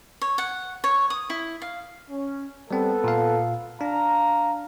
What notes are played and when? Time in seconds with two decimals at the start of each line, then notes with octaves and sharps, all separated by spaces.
0.22 C#5
0.38 F#5
0.84 C#5
1.10 D#6
1.30 E4
1.62 F5
2.10 C#4
2.71 G3 B3 C4 A4
3.04 A#2 F5
3.81 D4 F5 A#5